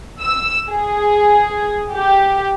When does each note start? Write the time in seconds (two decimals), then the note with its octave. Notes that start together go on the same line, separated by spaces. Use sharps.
0.21 E6
0.69 G#4
1.94 G4